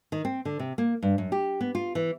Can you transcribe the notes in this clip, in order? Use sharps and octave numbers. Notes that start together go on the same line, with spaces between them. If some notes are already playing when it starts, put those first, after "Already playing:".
D#3
C4
D3
C3
A#3
G2
F#2
G4
B3
F4
E3